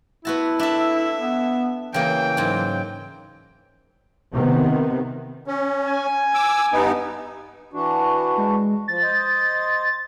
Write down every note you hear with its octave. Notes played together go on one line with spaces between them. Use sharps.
B3 E4 F#4 A5
D4 A4 E5
B3
C#3 E3 A#3 G5
G#2 F#3
C3 D#3 B3
C#4
G#5
D6 E6
G2 B3 D#4
E3 D4 F#4
G#3
F3 A6
C5 D#5